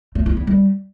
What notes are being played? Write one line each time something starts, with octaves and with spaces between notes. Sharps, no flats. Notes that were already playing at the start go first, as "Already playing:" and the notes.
A3
E4
E4
G3